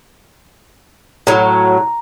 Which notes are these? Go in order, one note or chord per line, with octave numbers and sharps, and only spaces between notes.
A2 F#3 A#5